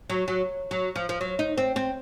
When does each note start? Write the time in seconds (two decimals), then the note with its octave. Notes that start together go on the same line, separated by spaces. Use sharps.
0.10 F#3
0.28 F#3
0.71 F#3
0.96 F3
1.09 F3
1.21 F#3
1.39 D#4
1.58 C4
1.76 C4